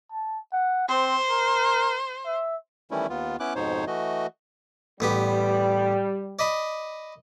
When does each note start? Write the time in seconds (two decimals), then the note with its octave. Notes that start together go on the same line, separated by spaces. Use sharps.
0.12 A5
0.53 F#5
0.88 C4 C5
1.30 A#4
2.26 E5
2.91 D#3 E3 G3 A3 C#4 E4
3.10 D#2 B3 F4
3.40 B3 C#4 E4 D6 F#6
3.56 F2 G#2 B2 D#4 C5 C#5
3.87 E3 A3 F#4 D#5
5.00 A1 G3 B3 G4
6.39 D5 D#5 B5